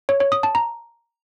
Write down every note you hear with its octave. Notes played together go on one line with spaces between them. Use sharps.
C#5
C#5
D#6
A5
A#5